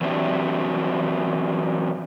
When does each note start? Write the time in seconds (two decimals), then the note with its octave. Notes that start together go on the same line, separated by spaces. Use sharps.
0.01 E3 F#3 C4 D4 G4 E5